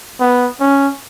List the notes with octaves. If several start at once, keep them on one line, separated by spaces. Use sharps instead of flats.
B3
C#4